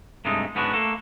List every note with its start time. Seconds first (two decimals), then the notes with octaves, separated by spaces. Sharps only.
0.25 G2 C3 G#3 A3 D#4
0.55 G#2 B3 C#4 D4 F#4
0.73 A3 A#3 A4